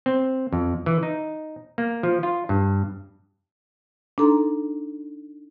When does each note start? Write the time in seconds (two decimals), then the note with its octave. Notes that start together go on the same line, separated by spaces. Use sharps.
0.06 C4
0.53 F2
0.86 E3
1.03 D#4
1.78 A#3
2.03 F3
2.23 F4
2.49 G2
4.18 D4 D#4 A4 A#5 C6